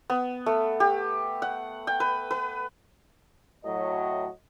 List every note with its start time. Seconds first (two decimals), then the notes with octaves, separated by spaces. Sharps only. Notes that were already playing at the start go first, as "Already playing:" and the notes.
0.10 B3
0.46 A3
0.80 G4
1.42 F#5
1.87 G5
2.00 B4
2.31 B4
3.65 A2 F#3 D#5